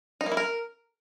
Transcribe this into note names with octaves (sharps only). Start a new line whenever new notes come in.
D#4
A#3
E4
A#4